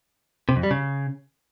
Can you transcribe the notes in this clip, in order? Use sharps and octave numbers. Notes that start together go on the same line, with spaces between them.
C3
F2
G3
C#3